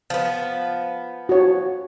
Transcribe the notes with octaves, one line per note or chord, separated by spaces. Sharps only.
F3 B3
F#4 C#5